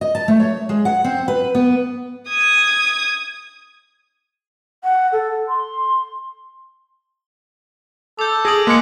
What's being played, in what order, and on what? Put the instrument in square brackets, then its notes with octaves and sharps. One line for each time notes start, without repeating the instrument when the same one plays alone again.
[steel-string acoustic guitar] D#5
A5
A3
C#5
G#3
F#5
C4
B4
B3
[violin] D#6 G#6
[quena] F#5
A4
C6
[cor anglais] A4 [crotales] D6 G6
[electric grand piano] G#4 D#6 [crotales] A#6 D7 F#7
[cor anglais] G#3 [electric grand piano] A#3 C#7 [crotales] D6 F#6 B6